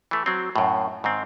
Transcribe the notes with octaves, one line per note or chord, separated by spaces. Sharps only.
E3 A3
F#3 C4
F#2 A2
G#2 D#3 C4